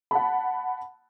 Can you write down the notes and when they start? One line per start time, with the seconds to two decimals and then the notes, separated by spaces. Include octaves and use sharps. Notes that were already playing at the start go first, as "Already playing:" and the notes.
0.11 F#5 A5 B5